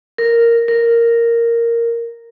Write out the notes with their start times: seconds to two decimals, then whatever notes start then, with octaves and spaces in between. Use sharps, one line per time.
0.18 A#4
0.68 A#4